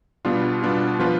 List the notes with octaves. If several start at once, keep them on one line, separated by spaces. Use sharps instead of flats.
B2 G3 B3 D4 F4
B2 G3 B3 D4 F4
F3 B3 D4 F4 B4